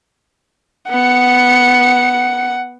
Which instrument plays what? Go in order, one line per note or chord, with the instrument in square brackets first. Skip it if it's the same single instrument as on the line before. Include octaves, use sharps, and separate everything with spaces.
[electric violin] B3 C#7 [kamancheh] F#5